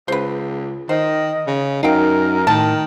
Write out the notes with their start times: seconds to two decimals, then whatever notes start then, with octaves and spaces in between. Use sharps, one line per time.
0.08 C#2 B4 C5
0.89 D#3 C5 D#5
1.47 C#3
1.83 F#2 D#4 A#4 F5 G5
2.47 A2 D#3 A5